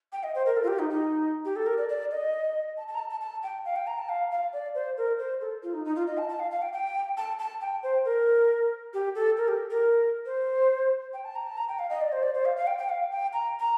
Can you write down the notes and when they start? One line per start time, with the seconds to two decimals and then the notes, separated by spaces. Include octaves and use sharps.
0.12 G5
0.23 D#5
0.35 C5
0.46 A#4
0.57 A4
0.63 F4
0.68 G4
0.79 D#4
0.90 D#4
1.45 G4
1.56 A4
1.66 A#4
1.78 D5
1.89 D5
2.11 D#5
2.77 A5
2.88 A5
2.95 A#5
2.99 A5
3.10 A5
3.21 A5
3.43 G5
3.65 F5
3.76 G5
3.87 A#5
3.98 A5
4.09 F5
4.31 F5
4.53 D5
4.75 C5
4.97 A#4
5.19 C5
5.41 A4
5.63 F4
5.74 D#4
5.85 D#4
5.96 F4
6.07 D#5
6.18 A5
6.29 A5
6.40 F5
6.51 F5
6.62 G5
6.73 G5
7.17 A5
7.39 A5
7.61 G5
7.83 C5
8.05 A#4
8.94 G4
9.15 A4
9.37 A#4
9.48 G4
9.70 A#4
10.26 C5
11.14 G5
11.25 A5
11.35 A#5
11.46 A5
11.57 A#5
11.69 G5
11.79 F5
11.90 D#5
12.01 D5
12.12 C5
12.23 D5
12.34 C5
12.45 F5
12.56 F5
12.67 G5
12.78 G5
12.90 F5
13.12 G5
13.33 A#5
13.59 A#5